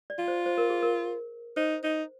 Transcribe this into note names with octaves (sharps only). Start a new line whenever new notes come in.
D5
F4
C5
C5
A#4
G#4
A#4
D#4 C5
D#4